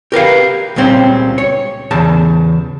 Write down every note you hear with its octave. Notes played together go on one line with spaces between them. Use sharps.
G4 A#4 B4 F5
C#2 A#2 G3 C4 C#4
C#5
E2 C#3 A5